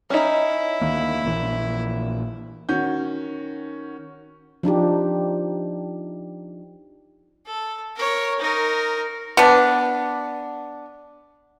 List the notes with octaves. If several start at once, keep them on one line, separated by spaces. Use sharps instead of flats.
C#4 D#4 E4
D2 D#3 A#3
A#1 A#2 E3
D#3 C#4 F#4 G6
F3 D4 D#4 G4
A4
A#4 C#5
D#4 A#4
B3 D4